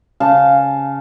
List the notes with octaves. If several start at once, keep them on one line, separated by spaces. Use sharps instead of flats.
C#3 F5 A5